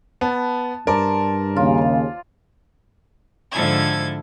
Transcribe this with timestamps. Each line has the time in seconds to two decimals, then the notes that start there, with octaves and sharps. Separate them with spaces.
0.21 B3 A5
0.87 G2 A#4 C5 D5 A5
1.56 D#2 C#3 F4
3.51 G#2 D3 F3 E4 A4 G#6